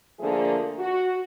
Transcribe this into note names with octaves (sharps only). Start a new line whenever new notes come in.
D3 F3 A3 A#3 G#4
F#4